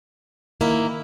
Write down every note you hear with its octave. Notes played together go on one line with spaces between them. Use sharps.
D#3 A#3 E4